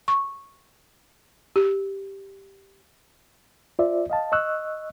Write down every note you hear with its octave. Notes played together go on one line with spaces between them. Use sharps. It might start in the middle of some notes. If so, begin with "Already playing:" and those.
C#6
G4
F4 C5 D5 E5
D#5 F5 A5
D#5 C#6 E6 F#6